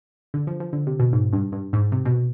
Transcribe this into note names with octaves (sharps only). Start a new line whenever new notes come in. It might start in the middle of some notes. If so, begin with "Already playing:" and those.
D3
F3
F3
D3
C3
B2
G#2
G2
G2
G#2
C3
B2